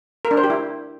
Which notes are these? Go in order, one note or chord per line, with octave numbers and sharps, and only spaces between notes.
A#4
D4
C5
G4
E4